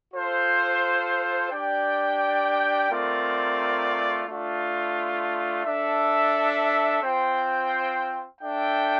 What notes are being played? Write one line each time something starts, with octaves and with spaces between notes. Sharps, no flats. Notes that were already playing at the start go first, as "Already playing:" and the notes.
F4 A4 C5
D4 G4 D5 G5
A3 C4 F4 A#4 D5
A3 D4 F4
D4 A4 E5
C4 F4 C5 G5
D4 A4 E5 G5